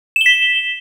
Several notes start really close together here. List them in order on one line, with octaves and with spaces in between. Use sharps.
E7 G7 B6